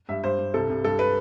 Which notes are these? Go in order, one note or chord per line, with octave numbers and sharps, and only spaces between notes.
G2 E5
G2 C5
G2
C2 A4
C2
G2 A4
B4